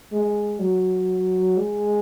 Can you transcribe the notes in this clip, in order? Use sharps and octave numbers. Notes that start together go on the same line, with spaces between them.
G#3
F#3
G#3